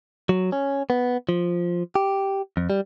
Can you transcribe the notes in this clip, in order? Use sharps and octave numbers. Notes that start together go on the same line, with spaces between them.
F#3
C#4
B3
F3
G4
F2
G3